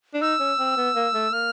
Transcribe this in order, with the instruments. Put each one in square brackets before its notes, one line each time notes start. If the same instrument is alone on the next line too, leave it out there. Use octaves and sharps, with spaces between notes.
[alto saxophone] D4
[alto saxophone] D#4 [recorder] E6
[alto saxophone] C#4
C4
B3
A#3
A3
[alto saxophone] A#3 [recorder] F6